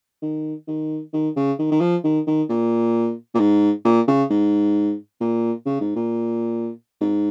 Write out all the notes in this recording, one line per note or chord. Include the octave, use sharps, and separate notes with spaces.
D#3
D#3
D#3
C#3
D#3
D#3
F3
D#3
D#3
A#2
A#2
G#2
A#2
C#3
G#2
A#2
C#3
G#2
A#2
G#2